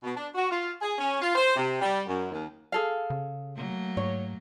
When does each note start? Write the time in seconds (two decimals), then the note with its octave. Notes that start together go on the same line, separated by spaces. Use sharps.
0.03 B2
0.16 D4
0.35 F#4
0.51 F4
0.81 G#4
0.98 C#4
1.21 F4
1.35 C5
1.56 C3
1.81 G3
2.07 F#2
2.31 D#2
2.72 G#4 A4 F5
3.10 C#3
3.55 F#3 A3 A#3
3.97 G#2 C#5